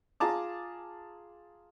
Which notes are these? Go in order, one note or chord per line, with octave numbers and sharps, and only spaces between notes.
F4 G#4 A5 A#5 D6